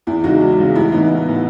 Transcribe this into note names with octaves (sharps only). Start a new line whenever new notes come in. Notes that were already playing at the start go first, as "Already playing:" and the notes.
E2 E4
C#3 G#3 D#4 F#4
E2
C#3 G#3
A1 E4
A2 E3 B3 D#4
A1
A2 E3 B3